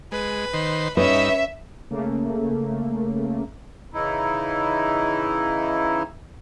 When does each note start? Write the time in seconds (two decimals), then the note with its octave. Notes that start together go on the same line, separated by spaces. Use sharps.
0.12 G#3 B4
0.53 D#3 C5
0.97 G2 C#4 D#4 B4 E5
1.90 C#3 A3 A#3
3.93 C#3 E3 D#4 E4